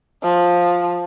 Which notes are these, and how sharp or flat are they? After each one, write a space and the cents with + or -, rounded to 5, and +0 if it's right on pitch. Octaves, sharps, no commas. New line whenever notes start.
F3 +10